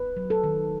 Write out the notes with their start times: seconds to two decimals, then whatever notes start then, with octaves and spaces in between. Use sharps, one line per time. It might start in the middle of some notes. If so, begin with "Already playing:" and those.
Already playing: B4
0.17 F#3
0.30 A4
0.44 D#3